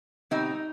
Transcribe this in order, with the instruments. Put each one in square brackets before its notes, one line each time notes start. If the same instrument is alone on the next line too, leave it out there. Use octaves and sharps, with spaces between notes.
[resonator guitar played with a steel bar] B2 G3 C4 D#4